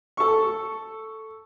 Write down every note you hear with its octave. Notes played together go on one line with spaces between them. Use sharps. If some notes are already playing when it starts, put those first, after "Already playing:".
A4 C#6